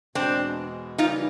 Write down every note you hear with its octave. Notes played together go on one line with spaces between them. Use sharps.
E2 B2 G#3 C4 D4
C#3 E3 G3 A#3 D#4 F4